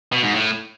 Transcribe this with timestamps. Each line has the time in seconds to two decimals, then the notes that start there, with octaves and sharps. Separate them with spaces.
0.12 B2
0.23 G#2
0.34 A2